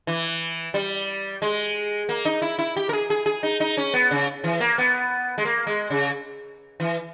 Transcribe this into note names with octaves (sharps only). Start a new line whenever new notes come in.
E3
G3
G#3
A#3
D#4
E4
E4
G4
A#4
G#4
G#4
G#4
D#4
D#4
C#4
B3
C#3
E3
A#3
B3
G#3
A#3
G#3
C#3
E3